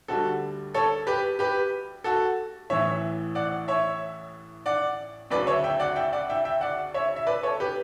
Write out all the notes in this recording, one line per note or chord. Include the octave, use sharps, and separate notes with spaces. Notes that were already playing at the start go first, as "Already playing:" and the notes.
D2 D3 G3 F#4 A4
A4 C#5
G4 B4
G4 B4
F#4 A4
A1 A2 E3 C#5 E5
D5 F#5
C#5 E5
D5 F#5
D2 C#3 F#3 B4 D5
C#5 E5
E5 G5
D5 F#5
E5 G5
D5 F#5
E5 G5
E5 G5
D5 F#5
C#5 E5
E5
B4 D5
A4 C#5
G4 B4